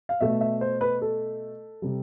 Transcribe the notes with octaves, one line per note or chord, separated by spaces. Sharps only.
F5
B2 A3 E5
E5
C5
B4
A4
C3 G3